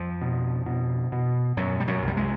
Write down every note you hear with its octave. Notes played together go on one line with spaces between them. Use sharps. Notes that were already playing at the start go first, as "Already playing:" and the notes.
Already playing: F2 F3
B2
B2
B2
F#2 B2 F#3
G3
F#2 F#3
C2
G3
G#3